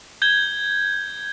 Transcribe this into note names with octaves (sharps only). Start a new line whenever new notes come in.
G6 G#6 G7